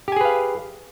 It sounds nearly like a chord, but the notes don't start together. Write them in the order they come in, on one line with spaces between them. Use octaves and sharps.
G4 G#5 G#4 B4 F5